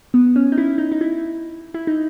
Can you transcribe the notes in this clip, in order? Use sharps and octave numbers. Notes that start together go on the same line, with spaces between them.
B3
C#4
D#4
E4
D#4
D#4
E4
E4
D#4